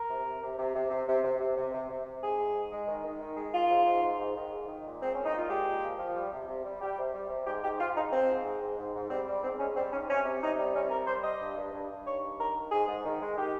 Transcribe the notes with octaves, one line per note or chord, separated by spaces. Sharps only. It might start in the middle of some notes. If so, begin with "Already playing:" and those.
Already playing: A#4
C3
C3
C3
C3
C3
C3
C3
C3
C3
C3
C3
C3
C3
G#2 G#4
G#3
G#2
G#3
D#3
D#3
D#3
G#3
D#3 F4
G#2
G#2
G#2
G#2
D#3
G#2
D#3
A#2
G#3 C4
A#2 C#4
D#4
A#2 F4
G#3 G4
A#2
F3
F3
G3
C3
C3
G3
G3 G4
C3
G3
C3
G#2 G4
G#2 G4
G#2 F4
F3 D#4
F3 C4
G#2
G#3
G#2
G#2
G#2
G3 C4
G3
G#2 C4
G#2 C#4
G3 C4
G#2 C#4
C3 C#4
C3
C3 D#4
G3
C3 C#4
G3 A#4
G3 C5
G3 D#5
G2
G2
G2
G2
D#3 C#5
G2
D#3 A#4
D#3
G#2 G#4
G#2
D#3
G#3
D#3 G4